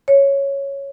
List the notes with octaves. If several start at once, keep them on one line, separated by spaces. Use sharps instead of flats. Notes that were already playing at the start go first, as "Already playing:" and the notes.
C#5